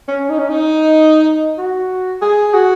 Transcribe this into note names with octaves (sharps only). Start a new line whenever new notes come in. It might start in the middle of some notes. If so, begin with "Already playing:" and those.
C#4
D#4
C#4
D#4
F#4
G#4
F#4